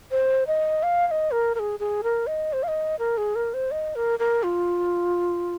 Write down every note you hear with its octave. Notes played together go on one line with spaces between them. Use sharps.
C5
D#5
F5
F5
D#5
A#4
A#4
G#4
G#4
A#4
D#5
C5
F5
D#5
A#4
G#4
A#4
C5
D#5
A#4
A#4
F4